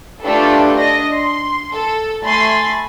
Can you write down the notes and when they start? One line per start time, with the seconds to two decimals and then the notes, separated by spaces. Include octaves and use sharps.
0.23 A3 D4 F4 G4 A4 B4
0.76 D4 D#5 A#6
1.13 C6
1.73 A4
2.24 A3 G#5 B5 C6 A6